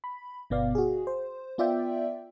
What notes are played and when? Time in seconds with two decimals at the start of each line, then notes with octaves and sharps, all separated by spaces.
0.04 B5
0.50 G1 B2 B3 D5 F5
0.75 F#4 G#4
1.07 C5
1.58 B3 F4 D5 E5 G5